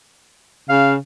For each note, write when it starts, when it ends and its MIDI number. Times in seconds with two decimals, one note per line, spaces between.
0.69 0.96 49
0.69 0.92 77